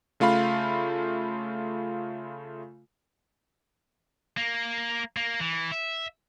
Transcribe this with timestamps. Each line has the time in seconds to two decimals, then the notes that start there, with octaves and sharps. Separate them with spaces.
0.20 C#3 A3 F4 F5 B5
4.37 A#3
5.17 A#3
5.40 E3
5.72 E5